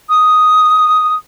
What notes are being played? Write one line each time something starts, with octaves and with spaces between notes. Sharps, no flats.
D#6